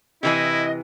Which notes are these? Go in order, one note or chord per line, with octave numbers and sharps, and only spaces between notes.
C3 E3 E4 D#5 G#5